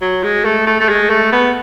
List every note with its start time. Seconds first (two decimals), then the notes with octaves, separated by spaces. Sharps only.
0.01 F#3
0.23 G#3
0.45 A3
0.66 A3
0.80 A3
0.89 G#3
1.10 A3
1.32 B3